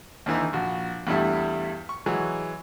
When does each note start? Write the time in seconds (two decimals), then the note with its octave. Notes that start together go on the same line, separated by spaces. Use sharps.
0.26 D#2 D3 E3 D#4
0.53 A#1 F#4
1.07 E2 G2 G3 A3 E4
1.89 C#6
2.06 E3 F#3 G#3